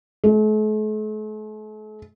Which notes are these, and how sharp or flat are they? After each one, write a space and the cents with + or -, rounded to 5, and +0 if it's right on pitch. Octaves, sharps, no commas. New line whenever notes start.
A3 -45